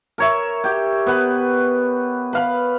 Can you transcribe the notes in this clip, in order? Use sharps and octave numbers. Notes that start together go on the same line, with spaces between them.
A#4 C#5 E5
G4 G5
B3 B4
B4 F5 B5